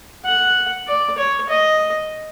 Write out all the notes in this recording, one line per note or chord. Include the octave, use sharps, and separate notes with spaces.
F#5
D5
C#5
D#5